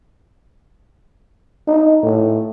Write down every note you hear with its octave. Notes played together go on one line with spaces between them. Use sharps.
D#4
A2